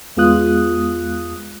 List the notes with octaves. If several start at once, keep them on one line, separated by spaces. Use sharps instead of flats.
E2 G#3 B3 F4 D#6 F#6